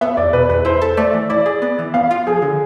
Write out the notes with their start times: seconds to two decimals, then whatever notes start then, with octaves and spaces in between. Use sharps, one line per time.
0.01 B3 E5
0.17 E2 D5
0.33 B2 B4
0.49 E2 B4
0.65 E4 C5
0.82 A4
0.97 A3 D5
1.14 E3
1.30 E4 D5
1.46 G#4
1.62 B3
1.79 E3
1.94 B3 F5
2.11 F4
2.27 F3 G#4
2.42 D3